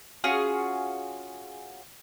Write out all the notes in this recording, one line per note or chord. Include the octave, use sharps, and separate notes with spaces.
C#4 F4 F#4 G#4